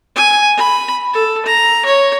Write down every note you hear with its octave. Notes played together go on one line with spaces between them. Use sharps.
G#5
B5
A4
A#5
C#5